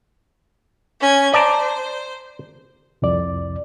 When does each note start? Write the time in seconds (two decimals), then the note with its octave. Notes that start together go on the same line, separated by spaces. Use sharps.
1.00 C#4 G#6
1.34 C5 D5 A5 A#5
3.02 C2 F2 D5